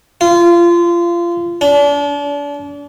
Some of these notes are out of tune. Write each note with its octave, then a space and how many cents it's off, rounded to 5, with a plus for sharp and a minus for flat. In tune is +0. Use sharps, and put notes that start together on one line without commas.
F4 -25
D4 -35